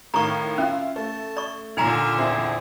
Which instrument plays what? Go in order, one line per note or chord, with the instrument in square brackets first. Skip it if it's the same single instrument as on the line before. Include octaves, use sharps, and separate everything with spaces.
[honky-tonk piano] A2 D#3 F5 [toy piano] A#5 C#6
[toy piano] C#4 [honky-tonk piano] E4 F4
[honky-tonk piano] A3 [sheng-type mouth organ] A5
[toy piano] D5 C#6
[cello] A#2 D3 [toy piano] D#4 G#5 A#5 [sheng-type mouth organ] F6
[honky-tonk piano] E2 C4 [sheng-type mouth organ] E4 G#4